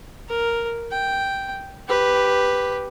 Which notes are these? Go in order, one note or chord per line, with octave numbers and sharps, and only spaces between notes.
A#4
G5
G4 B4